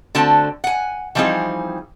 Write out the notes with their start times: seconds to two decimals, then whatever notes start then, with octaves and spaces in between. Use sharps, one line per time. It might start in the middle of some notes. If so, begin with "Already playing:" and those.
0.15 D3 A3 C4 F#4 A5
0.64 F#5 G#5
1.15 E3 F3 G3 C4 D#4 G#4